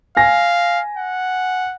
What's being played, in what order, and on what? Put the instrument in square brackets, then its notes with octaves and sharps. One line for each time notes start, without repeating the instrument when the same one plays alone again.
[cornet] F5 [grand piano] G#5 A#6
[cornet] F#5